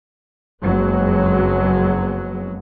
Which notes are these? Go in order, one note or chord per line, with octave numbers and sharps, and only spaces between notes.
F#1 F2 F#3 G#3 B3